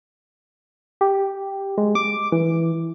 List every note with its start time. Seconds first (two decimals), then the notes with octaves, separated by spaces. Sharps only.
1.01 G4
1.78 G#3
1.95 D6
2.32 E3